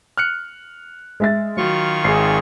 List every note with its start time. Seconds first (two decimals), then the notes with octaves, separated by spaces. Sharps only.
0.17 F6 F#6 C#7
1.20 G#3 E5 A6
1.57 D#3 F#3 F4 C#6
2.04 G#1 G#4 C7